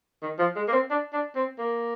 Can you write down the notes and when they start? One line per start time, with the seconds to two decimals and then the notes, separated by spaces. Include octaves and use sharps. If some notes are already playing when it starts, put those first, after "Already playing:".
0.22 D#3
0.39 F3
0.56 G#3
0.68 A#3
0.73 C4
0.90 D4
1.13 D4
1.36 C4
1.59 A#3